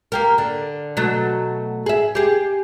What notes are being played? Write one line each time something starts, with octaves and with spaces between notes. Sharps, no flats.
A#3 G4 A#4
D3
B2 F#3 A3
G#4 E5
G4 G#4